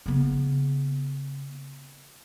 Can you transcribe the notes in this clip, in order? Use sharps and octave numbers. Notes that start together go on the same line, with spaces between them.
C#3 B3